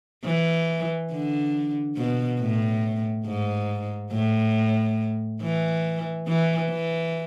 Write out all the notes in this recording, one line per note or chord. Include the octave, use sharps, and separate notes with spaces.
E3
D3
B2
A2
G#2
A2
E3
E3
E3